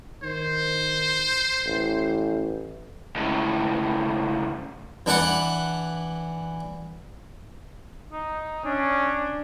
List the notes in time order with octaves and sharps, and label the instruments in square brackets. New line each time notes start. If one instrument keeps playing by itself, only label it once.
[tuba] D#3 [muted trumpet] C5
[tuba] A1
[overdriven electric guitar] C#2 A2
[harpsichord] E3 D4 B4 F#5
[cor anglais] D#4
[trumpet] C#4 [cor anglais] D4